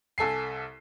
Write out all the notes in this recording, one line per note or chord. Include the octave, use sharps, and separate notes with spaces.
C2 A4 G#5 C7